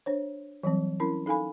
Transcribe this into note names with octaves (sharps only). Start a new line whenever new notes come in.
D4 C5 C#5
E3 F#3 G3 C4
C#4 E4 A#4 B5
D#4 A4 F5 G#5 B5